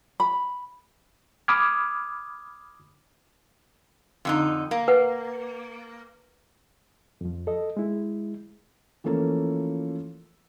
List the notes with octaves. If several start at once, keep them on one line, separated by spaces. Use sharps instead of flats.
B5
B5 D6 D#6 F6 G#6
F2 D3 D#4
A#3
B4 F#5
F2 F3
A4 D#5
G#3 E4
E3 F3 A3 A#3 C#4 A4